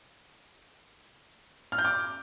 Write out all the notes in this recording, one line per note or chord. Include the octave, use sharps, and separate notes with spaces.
F6
G6
D6